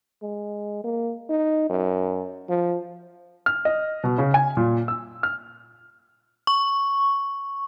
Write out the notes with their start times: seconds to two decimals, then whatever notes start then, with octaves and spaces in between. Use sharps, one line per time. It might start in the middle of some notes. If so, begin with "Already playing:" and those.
0.22 G#3
0.84 A#3
1.30 D#4
1.70 F#2
2.49 F3
3.46 F6
3.65 D#5
4.04 B2
4.18 C#3
4.34 G#5
4.57 A#2
4.88 E6
5.23 F6
6.47 C#6